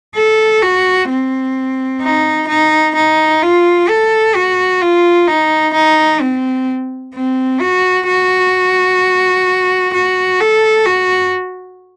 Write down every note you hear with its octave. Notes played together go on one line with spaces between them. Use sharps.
A4
F#4
C4
D#4
D#4
D#4
F4
A4
F#4
F4
D#4
D#4
C4
C4
F#4
F#4
F#4
A4
F#4